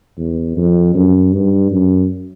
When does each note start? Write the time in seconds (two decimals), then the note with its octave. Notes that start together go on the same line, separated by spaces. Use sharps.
0.17 E2
0.57 F2
0.95 F#2
1.33 G2
1.71 F#2